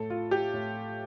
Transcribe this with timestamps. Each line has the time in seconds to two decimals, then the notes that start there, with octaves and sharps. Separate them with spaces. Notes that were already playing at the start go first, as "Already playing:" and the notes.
Already playing: A2 A4
0.10 F4
0.31 G4
0.53 A2